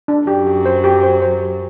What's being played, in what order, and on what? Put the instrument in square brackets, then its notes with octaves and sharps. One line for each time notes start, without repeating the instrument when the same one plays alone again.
[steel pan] D4
[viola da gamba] F#2 F#3 [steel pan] G4
[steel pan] G4
C5
G4
C5
C5
G4